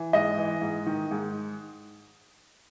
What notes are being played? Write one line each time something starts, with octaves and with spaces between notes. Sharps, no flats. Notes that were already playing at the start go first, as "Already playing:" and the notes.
Already playing: E3
G#2 D#5
E3
G#2
D#3
G#2